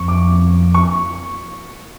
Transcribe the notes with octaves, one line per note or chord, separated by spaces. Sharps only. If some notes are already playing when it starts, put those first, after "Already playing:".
Already playing: F2 C#6
D6
C#6